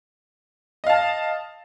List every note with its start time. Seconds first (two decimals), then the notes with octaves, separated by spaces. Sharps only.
0.84 D#5
0.87 F5
0.89 A5